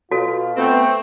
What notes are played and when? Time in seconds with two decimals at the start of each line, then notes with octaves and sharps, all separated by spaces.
0.11 B2 F4 F#4 A4
0.57 A3 B3 C4